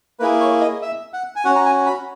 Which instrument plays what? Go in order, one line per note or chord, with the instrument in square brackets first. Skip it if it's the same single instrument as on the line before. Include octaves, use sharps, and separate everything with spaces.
[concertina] A#3 E4 G#4 B4
C#5
D#5
E5
F#5
G#5
C#4 F#4 F#5
A#5
G#5
B5